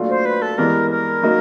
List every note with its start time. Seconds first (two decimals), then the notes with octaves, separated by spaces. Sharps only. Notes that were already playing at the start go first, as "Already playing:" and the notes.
Already playing: A#2 F#3 A3 D4 F4
0.09 C5
0.25 B4
0.41 A4
0.58 G2 E3 G#3 B3 A#4
0.90 A#4
1.23 F#3 A#3 D#4